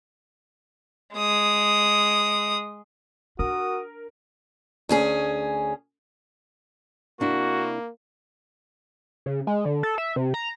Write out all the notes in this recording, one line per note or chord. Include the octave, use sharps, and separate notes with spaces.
G#3 D#6
D4 F#4 A#4 D#6
D2 C#4 G#4
C3 A#3 D4 E4 F#4
C#3
G#3
D3
A4
E5
C3
A#5